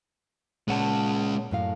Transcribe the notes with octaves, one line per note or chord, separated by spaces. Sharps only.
A#2 G#3 C#4 F#5 A5
F#2 A2 F5